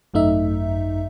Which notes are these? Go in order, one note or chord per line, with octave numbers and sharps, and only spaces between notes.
G#1 F#2 A3 D#4 E5